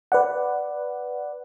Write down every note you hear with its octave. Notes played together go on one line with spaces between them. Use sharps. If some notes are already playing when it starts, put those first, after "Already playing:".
B4 D5 F#5